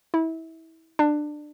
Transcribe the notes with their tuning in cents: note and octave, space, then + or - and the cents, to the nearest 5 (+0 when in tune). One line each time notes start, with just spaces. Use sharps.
E4 -25
D4 +20